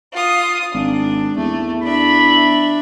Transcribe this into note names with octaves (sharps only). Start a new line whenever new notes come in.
F4 D#6
G#1 D4
E2 A3
D4 E5 B5